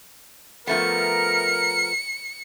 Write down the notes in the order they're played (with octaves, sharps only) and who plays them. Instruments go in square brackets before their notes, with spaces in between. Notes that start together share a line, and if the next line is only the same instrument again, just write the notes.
[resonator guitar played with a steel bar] F3 A3 B3 [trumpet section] A#4 [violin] C#7